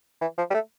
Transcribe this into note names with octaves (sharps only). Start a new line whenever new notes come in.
E3
F3
G3
A3